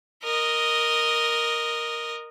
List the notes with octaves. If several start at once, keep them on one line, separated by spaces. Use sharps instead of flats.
A#4 D#5